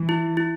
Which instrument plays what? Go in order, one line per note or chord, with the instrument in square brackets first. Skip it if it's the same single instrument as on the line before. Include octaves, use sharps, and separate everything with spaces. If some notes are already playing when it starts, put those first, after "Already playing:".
Already playing: [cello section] E3
[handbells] E4
E4